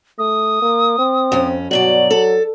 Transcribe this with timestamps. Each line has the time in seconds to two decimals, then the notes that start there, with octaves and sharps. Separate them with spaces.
0.19 A3 D#6
0.62 A#3
0.98 C4
1.32 F2 C#4
1.71 G2 B2 F#3 D5 F#7
2.11 A4